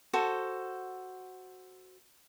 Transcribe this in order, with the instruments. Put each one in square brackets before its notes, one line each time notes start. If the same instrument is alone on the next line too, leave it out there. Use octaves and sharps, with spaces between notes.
[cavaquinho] F#4 A4 C5